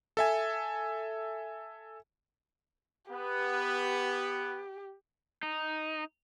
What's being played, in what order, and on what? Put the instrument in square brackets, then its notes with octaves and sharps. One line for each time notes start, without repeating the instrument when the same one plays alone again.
[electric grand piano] A4 E5 G#5
[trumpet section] B3 [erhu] G4
[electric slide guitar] D#4